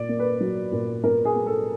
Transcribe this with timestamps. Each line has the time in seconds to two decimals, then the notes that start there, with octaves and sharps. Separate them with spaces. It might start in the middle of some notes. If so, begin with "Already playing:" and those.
Already playing: A#2 D5
0.09 A#3
0.19 B4
0.40 F#3
0.72 A#2
1.04 A#2 A#4
1.25 G#4
1.35 A#3
1.46 A4